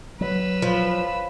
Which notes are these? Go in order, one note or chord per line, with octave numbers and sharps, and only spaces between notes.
F#3 B4 E6
F3 C#5 F5 B5